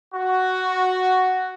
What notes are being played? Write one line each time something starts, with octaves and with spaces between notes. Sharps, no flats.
F#4